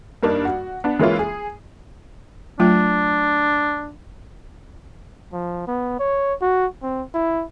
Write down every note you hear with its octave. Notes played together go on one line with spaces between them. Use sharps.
G2 A#3 D4 D#4
F#4
B3 D4
E3 G#3 A#3 C#4 E4 F4
G#4
F#3 A3 D4 F4
F3
B3
C#5
F#4
C4
E4